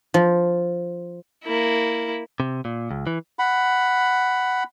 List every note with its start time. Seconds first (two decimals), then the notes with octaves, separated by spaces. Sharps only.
0.14 F3
1.44 A#3 E4
2.40 C3
2.65 A#2
2.91 C#2
3.07 E3
3.39 F#5 B5